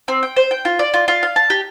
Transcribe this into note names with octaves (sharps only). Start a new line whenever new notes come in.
C4
G5
C5
G5
F4
D5
F4
F4
F5
A5
G4